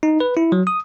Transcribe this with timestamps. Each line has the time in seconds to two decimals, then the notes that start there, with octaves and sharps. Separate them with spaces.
0.03 D#4
0.20 B4
0.37 E4
0.52 F#3
0.67 D#6